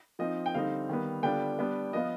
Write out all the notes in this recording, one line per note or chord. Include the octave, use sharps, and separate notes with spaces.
F3 C4 D#4 D#5
G5
D3 G3 C4 D#4 F5
D#3 G3 B3
D3 G3 B3 D4 F4 G5
G3 B3 D4
F3 B3 F4 D#5